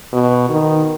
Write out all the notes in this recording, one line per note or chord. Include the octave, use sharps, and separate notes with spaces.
B2
D#3